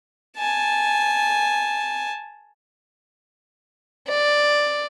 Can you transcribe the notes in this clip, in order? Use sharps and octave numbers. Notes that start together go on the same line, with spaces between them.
G#5 A5
D5